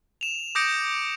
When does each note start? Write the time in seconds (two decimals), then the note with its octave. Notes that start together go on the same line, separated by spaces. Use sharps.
0.21 E7 F7
0.55 D6 D#6 G6 A#6 C#7 D7